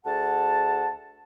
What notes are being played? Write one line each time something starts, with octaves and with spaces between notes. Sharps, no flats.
D2 G#4 F#5 A5